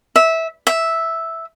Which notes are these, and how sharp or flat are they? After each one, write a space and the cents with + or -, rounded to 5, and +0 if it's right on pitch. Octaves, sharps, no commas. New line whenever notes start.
E5 -15
E5 -5